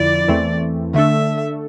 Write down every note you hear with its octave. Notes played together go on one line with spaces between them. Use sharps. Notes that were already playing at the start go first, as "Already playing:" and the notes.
Already playing: F2 D3 F3 E4 D5
E2 E3 A3 C4
D3 A3 D4 A4 E5